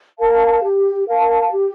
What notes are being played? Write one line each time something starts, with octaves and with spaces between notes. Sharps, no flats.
A#4 F5 A5
G4
A#4 F5 A5
G4